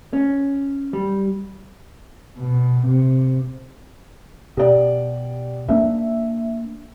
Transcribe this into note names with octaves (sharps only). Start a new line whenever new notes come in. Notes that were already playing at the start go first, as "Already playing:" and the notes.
C#4
G3
B2
C3
B2 G4 D5
G2 A#3 D4 E5